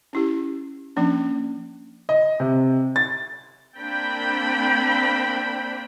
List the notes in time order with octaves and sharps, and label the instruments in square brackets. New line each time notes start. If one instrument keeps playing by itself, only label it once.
[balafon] C#4 E4 G4
F3 A#3 C#4 D4
[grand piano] D#5
C3
A6
[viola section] A#3 C4 D4 G5 B5